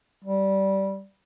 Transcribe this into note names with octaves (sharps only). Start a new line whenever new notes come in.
G3